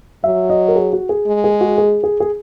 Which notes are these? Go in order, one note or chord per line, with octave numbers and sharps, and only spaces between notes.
F#3 E5
D#5
A#4
G#4
F#4
G#4
G#3
G#4
F#4
G#4
G#4
G#4